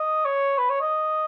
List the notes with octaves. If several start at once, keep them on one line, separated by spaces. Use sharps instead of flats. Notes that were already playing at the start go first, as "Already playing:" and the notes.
Already playing: D#5
C#5
B4
C#5
D#5